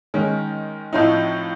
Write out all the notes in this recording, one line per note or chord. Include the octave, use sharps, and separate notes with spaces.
D#3 G#3 C#4
A2 F3 A3 C4 D#4